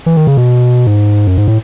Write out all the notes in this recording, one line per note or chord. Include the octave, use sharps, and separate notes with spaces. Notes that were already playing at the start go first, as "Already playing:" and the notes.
E3
D#3
C#3
B2
G#2
F#2
G#2
A2